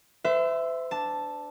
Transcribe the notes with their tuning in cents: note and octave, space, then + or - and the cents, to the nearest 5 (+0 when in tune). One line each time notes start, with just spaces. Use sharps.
C5 -45 E5 +5 C6 +0
D4 +0 A5 +0